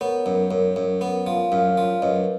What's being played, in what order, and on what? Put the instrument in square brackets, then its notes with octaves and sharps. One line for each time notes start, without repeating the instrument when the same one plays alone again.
[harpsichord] B3 [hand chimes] A#4 C#5
[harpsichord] F#2
F#2
F#2
B3
F3
[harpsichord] F#2 [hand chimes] C#5 F5
[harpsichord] F3
[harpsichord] F#2 [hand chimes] B4 D#5